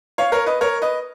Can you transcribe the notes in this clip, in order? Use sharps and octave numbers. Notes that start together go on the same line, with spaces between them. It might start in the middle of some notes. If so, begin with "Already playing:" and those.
C#5 F5
A#4 C#5
B4 D#5
A#4 C#5
B4 D#5